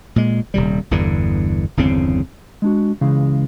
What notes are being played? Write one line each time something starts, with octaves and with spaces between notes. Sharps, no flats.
A#2 G#3
D#1 C3 G3
G1 E2 G2 D3
G1 E2 C#3 C4
G#3 D4 F#4
C#2 C#3 E3 G#3 F5